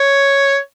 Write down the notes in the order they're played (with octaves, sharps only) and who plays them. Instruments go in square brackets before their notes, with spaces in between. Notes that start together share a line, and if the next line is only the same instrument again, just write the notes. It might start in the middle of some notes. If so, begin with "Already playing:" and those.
Already playing: [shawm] C#5